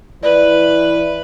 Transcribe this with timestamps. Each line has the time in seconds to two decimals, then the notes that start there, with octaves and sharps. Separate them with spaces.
0.23 E3 B4 D5